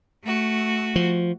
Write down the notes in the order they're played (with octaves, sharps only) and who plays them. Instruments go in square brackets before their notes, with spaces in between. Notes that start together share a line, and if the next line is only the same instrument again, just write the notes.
[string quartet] A3 F#4
[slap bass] F3